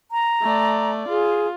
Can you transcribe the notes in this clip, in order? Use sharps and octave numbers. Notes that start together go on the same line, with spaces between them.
A#5
A3 D5
F4 G#4